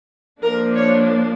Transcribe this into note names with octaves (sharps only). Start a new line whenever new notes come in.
F3 A#3 D4 A#4
C#5